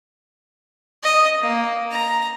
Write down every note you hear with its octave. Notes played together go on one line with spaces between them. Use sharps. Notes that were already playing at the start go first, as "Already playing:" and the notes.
D#5
A#3
A#5